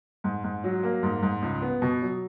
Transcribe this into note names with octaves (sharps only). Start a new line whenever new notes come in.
G#2
G#2
F#3
A#3
G#2
G#2
C#2
B3
B2
F#3